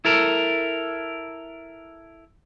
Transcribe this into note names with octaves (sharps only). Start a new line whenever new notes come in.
E4 A4 A#4